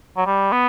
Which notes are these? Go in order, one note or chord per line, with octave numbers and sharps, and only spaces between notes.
F#3
G3
B3